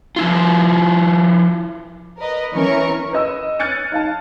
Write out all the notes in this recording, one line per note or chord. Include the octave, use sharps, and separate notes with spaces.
F3 E4 F4
A#4 B4 D#5
E3 C#4 A#4 C#6
B4 D#5 E6
F6 F#6 G#6 A6 C#7 D#7
D#4 F5 A5